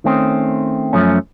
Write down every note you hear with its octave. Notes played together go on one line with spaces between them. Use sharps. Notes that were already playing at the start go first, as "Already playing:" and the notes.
D#3 A3 C4 C#4
F#2 F3 A3 C#4